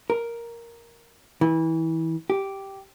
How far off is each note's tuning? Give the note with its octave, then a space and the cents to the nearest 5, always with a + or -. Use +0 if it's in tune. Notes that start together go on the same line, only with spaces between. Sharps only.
A#4 +5
E3 -25
G4 -5